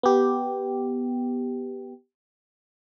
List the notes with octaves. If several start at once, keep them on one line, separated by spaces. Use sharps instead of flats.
B3 G4